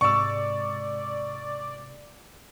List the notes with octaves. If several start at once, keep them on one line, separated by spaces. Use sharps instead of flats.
G#2 C3 G#3 D5 C#6 E6